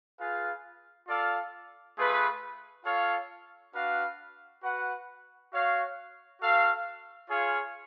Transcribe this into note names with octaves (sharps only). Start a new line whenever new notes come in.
F4 G#4 B4 F5
F4 A4 D5 F5
A3 F4 G#4 B4
F4 A4 C#5 F5
D4 F#4 B4 F5
F#4 B4 F#5
F#4 C#5 F5
F#4 A4 F5
F4 G#4 C#5 F5